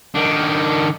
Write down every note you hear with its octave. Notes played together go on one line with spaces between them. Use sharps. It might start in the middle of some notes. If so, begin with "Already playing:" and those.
D#3 D4